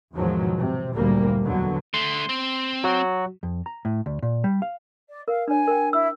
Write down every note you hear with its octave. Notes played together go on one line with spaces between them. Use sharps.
E2 G#2 B2 D#3 F3 F#3
C3
F#1 D2 A#2 G3 A#3
E2 B2 D3 F#3
D3 A3 C6
C4
F#3 F#4
F2
A#5
A2
D2
A#2
G3
F5
D5
A#4 F5
D4 C#5 G#5
A#4 G5
E4 E6